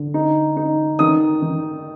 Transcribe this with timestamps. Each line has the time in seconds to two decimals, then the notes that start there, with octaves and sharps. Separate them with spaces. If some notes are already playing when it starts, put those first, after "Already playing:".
Already playing: D3
0.14 D#4
0.57 D#4
0.99 D#3 D#6
1.42 D#3